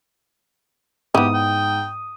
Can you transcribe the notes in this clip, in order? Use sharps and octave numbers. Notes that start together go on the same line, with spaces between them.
G#2 B3 E4 G4 D#6
G5